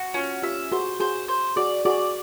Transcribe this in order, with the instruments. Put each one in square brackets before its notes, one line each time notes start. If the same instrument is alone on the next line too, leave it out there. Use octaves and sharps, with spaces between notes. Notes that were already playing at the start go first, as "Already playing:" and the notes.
Already playing: [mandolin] F#4
[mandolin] C#4 [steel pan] F4
[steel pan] F4 G4 [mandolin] E5
[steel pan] F#4 G#4 [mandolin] C5
[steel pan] F#4 G#4 [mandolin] C5
[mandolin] C5
[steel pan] F#4 G#4 [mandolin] D5
[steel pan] F#4 G#4 [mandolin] D5